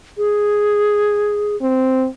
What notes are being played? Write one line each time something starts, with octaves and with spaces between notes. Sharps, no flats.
G#4
C4